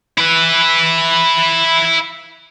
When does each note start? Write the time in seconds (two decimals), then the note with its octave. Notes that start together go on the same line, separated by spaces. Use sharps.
0.18 E4 B4